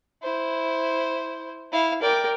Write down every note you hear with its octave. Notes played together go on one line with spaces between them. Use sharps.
E4 C5
E4 F5
A#4 D5 G5